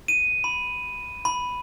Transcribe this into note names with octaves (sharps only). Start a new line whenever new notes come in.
D#7
B5
B5